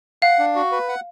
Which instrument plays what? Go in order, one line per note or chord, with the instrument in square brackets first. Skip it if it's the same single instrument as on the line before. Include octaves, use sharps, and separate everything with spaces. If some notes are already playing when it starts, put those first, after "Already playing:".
[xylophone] F5 [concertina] F#5
[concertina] D4
F#4
B4
F#5